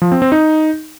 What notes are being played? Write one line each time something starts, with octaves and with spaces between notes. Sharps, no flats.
F3
C4
C4
D#4